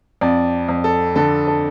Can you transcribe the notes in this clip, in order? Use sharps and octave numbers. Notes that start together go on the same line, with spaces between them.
F2 D5
F2
A4
D3 A4
A4